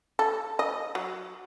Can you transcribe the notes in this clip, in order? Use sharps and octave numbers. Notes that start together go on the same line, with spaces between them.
A4
D#5
F#3